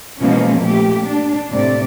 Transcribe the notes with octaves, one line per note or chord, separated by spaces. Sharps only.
B2 E3 F3 G#3 A#3 C#4
A#2 A3 G4
D4
A2 C3 A3 D5